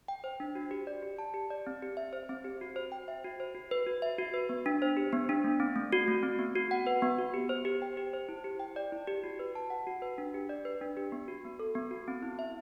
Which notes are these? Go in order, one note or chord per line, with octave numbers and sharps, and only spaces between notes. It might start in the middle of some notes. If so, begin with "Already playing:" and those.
G5
C5
D4
F#4
G4
D5
G4
A5
G4
D5
C4
G4
E5
C5
C4
G4
F#4
C5
G5
E5
F#4
C5
F#4
B4
F#4
E5
F#4
B4
B3
D4
C5
G4
B3
D4
A3
C4
A3
F#4
A3
C4
B3
F#4
F#5
B4
B3
F#4
G4
C5
G4
G5
G4
C5
E4
G4
G5
D5
E4
G4
F#4
B4
A5
F#5
F#4
B4
D4
G4
D5
B4
D4
G4
B3
F#4
B3
A4
B3
F#4
C4
E4
E5